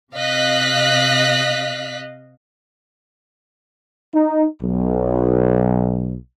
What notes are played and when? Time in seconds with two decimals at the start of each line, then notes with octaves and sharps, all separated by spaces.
0.15 C3 D#5 F5 F#6 B6
4.14 D#4
4.63 B1